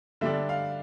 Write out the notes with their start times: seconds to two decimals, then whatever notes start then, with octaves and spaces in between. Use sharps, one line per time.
0.21 D3 G3 D4 E5
0.49 F5